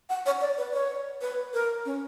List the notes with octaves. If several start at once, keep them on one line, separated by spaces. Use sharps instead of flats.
F#5
C#5
D5
B4
C#5
B4
A#4
C#4